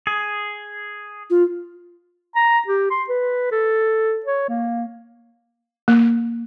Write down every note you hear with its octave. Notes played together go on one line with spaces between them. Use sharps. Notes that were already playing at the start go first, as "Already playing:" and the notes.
G#4
F4
A#5
G4
C6
B4
A4
C#5
A#3
A#3